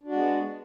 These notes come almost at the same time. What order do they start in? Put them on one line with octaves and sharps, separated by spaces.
D4 F#4 G#3 B3